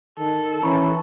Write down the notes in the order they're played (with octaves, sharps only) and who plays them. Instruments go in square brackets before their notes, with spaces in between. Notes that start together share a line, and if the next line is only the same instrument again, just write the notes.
[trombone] D#3 [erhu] A4
[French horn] E3 [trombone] C#4 [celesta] A#5 B5 C#6